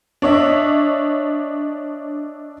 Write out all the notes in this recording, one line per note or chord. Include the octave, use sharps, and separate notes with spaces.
D4 C#5 D#5 E5